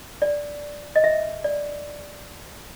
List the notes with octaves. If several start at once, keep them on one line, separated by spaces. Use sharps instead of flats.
D5
D#5
E5
D5